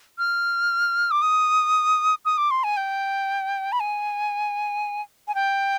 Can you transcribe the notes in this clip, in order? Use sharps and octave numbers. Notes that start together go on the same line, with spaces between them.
F6
D6
D#6
D#6
D6
C6
G#5
G5
B5
G#5
G#5
G5